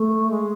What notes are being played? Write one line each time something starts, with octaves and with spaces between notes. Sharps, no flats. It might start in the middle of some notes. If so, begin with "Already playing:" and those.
Already playing: A3
G#3